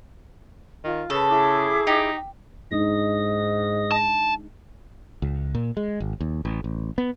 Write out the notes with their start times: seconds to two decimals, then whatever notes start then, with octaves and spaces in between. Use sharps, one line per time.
0.84 D#3 F4
1.10 C#3 A4 B4
1.29 E4 G#4 D6
1.87 D#4 G4
2.71 G#2 G#3 D4 D#4 D#5 D#6
3.92 A5
5.22 C#2
5.55 A#2
5.77 G#3
6.00 G#1
6.20 D#2
6.45 A1
6.64 A1
6.98 B3